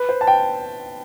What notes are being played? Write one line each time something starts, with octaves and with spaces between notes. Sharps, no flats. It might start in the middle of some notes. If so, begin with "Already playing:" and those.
Already playing: B4
C5
A5
G5